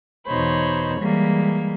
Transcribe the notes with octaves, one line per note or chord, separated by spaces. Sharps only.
E2 B2 D#4 C5 C#5 B5
E3 G3 G#3 A#3